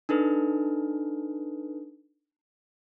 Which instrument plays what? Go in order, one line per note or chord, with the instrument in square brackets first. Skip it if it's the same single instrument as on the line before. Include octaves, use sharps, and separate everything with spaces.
[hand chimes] D4 D#4 A4 B4